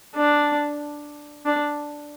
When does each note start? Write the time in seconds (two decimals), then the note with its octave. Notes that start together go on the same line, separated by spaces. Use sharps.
0.15 D4
1.45 D4